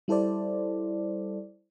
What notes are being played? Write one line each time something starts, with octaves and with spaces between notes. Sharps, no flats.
G3 E4 A4 C5 D5